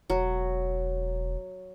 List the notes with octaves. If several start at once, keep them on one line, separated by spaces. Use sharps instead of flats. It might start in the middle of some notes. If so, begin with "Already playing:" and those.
E1 F#3